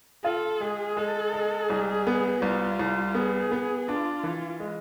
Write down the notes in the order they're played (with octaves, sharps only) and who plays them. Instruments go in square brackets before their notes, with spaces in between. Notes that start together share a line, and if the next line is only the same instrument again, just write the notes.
[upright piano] F4 [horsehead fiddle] A4
[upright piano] G#3 [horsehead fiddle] G#4
[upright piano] G#3 [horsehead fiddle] A4
[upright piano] G#3
[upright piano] C2 [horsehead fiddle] G#4
[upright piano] B3
[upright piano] C2 [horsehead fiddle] F4
[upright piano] C2
[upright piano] B3 [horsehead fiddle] G#4
[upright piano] B3
[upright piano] D4 [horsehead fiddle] F4
[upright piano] E3
G#3